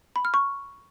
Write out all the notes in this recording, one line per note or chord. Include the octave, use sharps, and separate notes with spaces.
B5
F6
C#6